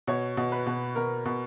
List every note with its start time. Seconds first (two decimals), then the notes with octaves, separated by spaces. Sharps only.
0.07 B2 C#5
0.37 B2
0.52 B4
0.67 B2
0.95 B2 A#4
1.25 B2